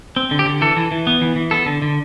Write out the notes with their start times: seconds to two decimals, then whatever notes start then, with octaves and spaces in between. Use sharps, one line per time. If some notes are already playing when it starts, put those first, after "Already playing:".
0.16 C4
0.31 D3
0.39 G4
0.46 D3
0.61 E3 A4
0.76 E3
0.91 E3
1.07 B3
1.21 E3
1.36 E3
1.51 B3 A4
1.66 D3
1.82 D3